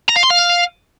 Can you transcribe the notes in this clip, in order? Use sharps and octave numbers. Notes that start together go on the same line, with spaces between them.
A#5
F5
C6
F5